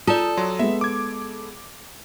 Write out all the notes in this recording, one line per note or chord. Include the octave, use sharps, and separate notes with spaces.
F4 A4 D5 D#6
F#3 C6
G#3 B3 E5
D6 G#6